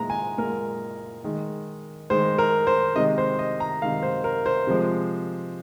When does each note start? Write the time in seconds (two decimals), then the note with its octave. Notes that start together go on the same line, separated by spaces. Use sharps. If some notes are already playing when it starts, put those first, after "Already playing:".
Already playing: A#2 G#3 A#5
0.10 G#5
0.38 A#2 G#3 A#4
1.24 D#3 G#3
2.10 D#3 G#3 C5
2.38 A#4
2.67 C5
2.96 C3 D#3 G#3 D#5
3.18 C5
3.39 D#5
3.60 A#5
3.82 C3 D#3 G#3 F5
4.03 C5
4.24 A#4
4.46 C5
4.67 C3 F3 G#3